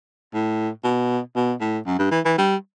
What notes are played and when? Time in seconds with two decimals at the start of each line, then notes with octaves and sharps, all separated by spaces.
0.34 A2
0.84 B2
1.36 B2
1.61 A2
1.86 F#2
1.99 G2
2.11 E3
2.25 E3
2.38 G3